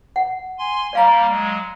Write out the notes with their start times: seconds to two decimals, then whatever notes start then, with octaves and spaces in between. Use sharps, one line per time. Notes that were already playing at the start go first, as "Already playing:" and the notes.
0.16 F#5
0.59 G#5 C6
0.93 G3 A#3 D5 F5 A#5
1.30 F#3 G#3